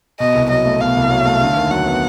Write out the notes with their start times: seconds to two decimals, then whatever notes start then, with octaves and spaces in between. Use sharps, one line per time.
0.20 B2 D#5
0.35 C2
0.50 F#3 D#5
0.66 A3
0.81 B2 F5
0.96 C2
1.10 F#3
1.25 A3
1.41 D3
1.57 D#2
1.71 F#3 F#5
1.86 B3